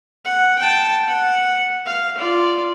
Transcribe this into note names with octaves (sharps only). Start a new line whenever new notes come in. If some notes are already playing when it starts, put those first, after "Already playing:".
F#5
G5 A5
F#5
F5
F4 D5